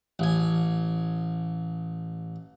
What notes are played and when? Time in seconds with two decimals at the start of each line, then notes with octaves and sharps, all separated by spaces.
0.19 A1 G#5